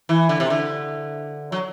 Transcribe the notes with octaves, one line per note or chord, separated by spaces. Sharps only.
E3
D3
C3
D3
F#3